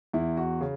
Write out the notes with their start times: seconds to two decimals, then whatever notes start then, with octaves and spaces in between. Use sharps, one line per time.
0.13 E2 E4
0.37 F#4
0.61 C#3